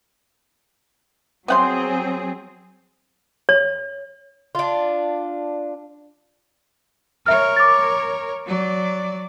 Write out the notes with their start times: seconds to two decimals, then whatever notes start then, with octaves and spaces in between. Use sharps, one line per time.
1.48 F#3 B3 C4 G#4 F#5 C6
3.49 C#5
4.55 D4 F4
7.26 A#4 C#5 E5 F6
7.56 D6 A6
8.46 F#3 D5